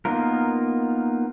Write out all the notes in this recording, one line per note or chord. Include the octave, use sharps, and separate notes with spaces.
A#3 B3 D#4 F4 A#4